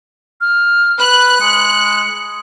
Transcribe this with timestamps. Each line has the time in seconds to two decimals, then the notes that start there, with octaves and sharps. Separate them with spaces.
0.41 F6
0.99 B4 F#6
1.41 G#3 C#7